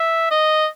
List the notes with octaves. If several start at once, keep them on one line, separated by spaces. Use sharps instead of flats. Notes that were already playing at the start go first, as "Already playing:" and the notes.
Already playing: E5
D#5